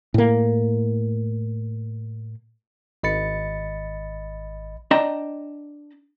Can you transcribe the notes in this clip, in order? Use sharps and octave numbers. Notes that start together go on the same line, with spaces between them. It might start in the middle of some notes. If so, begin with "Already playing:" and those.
A2 A#3
G#1 D#5 B5 A6 C#7
D4 D#5 G5 A5 A#5